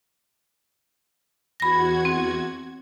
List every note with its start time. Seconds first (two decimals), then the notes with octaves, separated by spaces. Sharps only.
1.60 E2 F#4 B5 G#6 A#6
2.05 C4